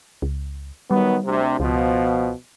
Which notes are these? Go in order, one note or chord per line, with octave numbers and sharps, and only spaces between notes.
C#2
D#3 F#3 G3 B3
D2 C3
C#2 B2 F3